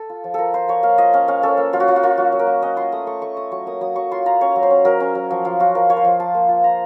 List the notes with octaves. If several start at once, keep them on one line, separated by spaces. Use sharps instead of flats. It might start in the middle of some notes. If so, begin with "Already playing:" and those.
Already playing: A4
F4
F3
F4 A4 A#4
F4 C5
F3 C#5
A#3 F5
F4 D#5
C#4 F5
C#4 F5
C#4 A4
A#3
F#3 F4
F#4
F#3 F4
F#4
A#3 F4
F#3 F#4
F#3
A#4
A#3
C#4 D#5
F4 C6
A3 D#6
A3 C#6
A3 C#6
A3 D#6
F#3 C#6
A#3 D#6
F#3 D#6
F#3 C#6
F4 C6
F4 A#5
C#4 C#5
F#3
C5
C#4
F#3 A#4
C#4
F#3
F3
F3 F4
F4 F#4
F3 A#4
F4 C#5
C5
F3
F4 A5
A#3
F4
F4 A#5